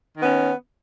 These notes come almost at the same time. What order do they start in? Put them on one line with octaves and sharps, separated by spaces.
D#3 B3 C#4